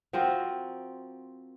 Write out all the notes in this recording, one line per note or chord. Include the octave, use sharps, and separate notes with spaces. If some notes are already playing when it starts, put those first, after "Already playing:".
F3 C4 F#4 A#4